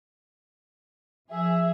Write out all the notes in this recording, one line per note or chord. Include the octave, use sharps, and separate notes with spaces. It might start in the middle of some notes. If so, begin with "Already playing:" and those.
F3 G#4 E5